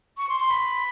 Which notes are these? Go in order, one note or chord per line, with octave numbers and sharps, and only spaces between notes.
C#6
C6
C6
B5